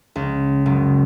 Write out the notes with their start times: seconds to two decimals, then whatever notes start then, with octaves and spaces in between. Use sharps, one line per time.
0.16 C#2
0.66 F#1